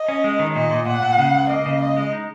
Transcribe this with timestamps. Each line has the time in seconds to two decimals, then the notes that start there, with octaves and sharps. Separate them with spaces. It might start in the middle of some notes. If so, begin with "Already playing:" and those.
Already playing: D#5
0.08 C#4
0.24 G#3
0.39 D#3
0.55 A#2 D#5
0.71 A#2
0.86 A#2 F#5
1.03 A#2
1.19 C#3
1.33 C#2
1.50 A#3 D#5
1.66 C#3
1.81 C#2 D#5
1.97 G#3
2.13 D#4